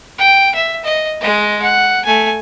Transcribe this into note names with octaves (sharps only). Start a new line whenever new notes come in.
G5
E5
D#5
G#3 D#5
F#5
A3 G#5